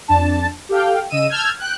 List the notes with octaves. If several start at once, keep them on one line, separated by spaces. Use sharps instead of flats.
F2 D4 A5
G4 A4 F5 G5
C#3 D#5 E6 D#7
A5 E6 F6 G6 G#6
G5 F#6